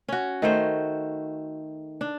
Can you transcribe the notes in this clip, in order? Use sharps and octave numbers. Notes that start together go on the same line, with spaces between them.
C#4 F#4
D#3 A3 C5
D4